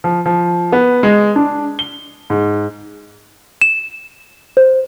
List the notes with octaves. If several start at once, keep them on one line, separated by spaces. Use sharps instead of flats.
F3
F3
B3
G#3
D4
G7
G#2
E7
C5